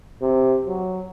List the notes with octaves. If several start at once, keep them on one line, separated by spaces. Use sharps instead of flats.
C3
F#3